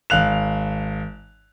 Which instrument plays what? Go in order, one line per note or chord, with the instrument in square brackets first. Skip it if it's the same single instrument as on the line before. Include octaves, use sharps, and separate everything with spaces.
[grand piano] G#1 F5 F#6 F7